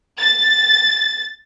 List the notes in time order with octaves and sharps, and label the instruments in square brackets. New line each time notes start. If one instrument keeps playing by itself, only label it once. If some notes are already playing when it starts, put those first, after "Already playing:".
[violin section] A6